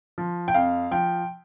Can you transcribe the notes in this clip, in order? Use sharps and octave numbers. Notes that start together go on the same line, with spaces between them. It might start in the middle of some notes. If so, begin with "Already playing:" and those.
F3
G5
F2 F5
F3 G5